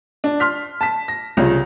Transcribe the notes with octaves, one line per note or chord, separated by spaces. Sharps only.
D4
C6 F6 B6
A5 B6
A#6
C2 C#3 F3